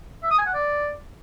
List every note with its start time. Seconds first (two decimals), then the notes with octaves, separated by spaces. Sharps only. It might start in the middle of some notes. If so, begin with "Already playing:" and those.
0.23 E5
0.31 D#6
0.38 G#5
0.46 F#5
0.54 D5